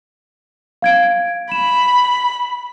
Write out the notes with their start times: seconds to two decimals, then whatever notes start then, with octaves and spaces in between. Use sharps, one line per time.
0.82 F5 G#6 D7
1.52 B5 E7